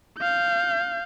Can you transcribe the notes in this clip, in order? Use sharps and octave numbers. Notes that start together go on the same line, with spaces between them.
F5 G6